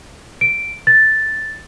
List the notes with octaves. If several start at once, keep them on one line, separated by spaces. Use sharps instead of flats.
D7
A6